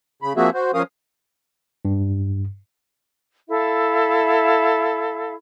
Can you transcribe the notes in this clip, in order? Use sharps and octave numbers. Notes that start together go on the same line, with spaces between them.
C#3 B5
F3 A#3 C4 F#4 G#4 E5
F#4 C5
F3 C#4 A#4 F5 D#6
G2
E4 A4 E5 F5